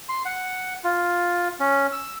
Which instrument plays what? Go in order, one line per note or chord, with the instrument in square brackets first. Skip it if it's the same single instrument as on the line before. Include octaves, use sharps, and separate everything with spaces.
[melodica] C6
F#5
F4
C#4
E6